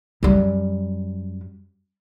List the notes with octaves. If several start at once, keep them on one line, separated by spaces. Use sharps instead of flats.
F#2 G3